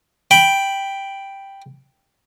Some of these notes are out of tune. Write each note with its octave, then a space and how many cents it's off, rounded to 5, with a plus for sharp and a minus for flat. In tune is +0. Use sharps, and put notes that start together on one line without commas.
G5 +0 B5 +0